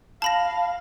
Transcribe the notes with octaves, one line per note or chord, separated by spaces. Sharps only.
F5 A5 B5 A#6